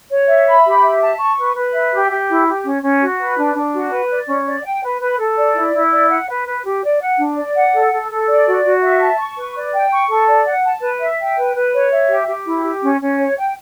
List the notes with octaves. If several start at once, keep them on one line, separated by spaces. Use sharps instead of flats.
C#5
E5
B5
G4
E5
A5
C#6
B4
B4
E5
G4
G4
E4
G4
C#4
C#4
F#4
B4
D4
D4
F#4
B4
D5
C#4
D5
G5
B4
B4
A4
D5
E4
E4
D5
F#5
B4
B4
G4
D5
F#5
D4
D5
F#5
A4
A4
A4
D5
F#4
F#4
E5
A5
C#6
B4
D5
G5
C#6
A4
D5
F#5
A5
B4
E5
G5
B4
B4
C#5
E5
G4
G4
E4
G4
C#4
C#4
C#5
G5